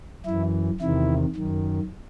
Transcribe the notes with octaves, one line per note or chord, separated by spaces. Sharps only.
F#2 E3 E4
E2 C3 D#3 E4
F#2 D#3